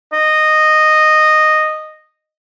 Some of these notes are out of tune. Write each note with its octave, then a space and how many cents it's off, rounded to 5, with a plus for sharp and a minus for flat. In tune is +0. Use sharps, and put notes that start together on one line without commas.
D#5 -10